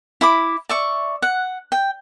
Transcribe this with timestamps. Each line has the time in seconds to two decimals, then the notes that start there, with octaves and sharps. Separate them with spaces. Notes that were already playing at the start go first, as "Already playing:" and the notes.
0.21 E4 B5 D6
0.69 D5 E5 C#6
1.22 F#5
1.72 G5